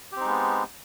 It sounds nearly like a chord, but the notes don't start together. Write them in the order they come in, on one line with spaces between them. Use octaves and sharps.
G4 C4 D#4 G#3 B3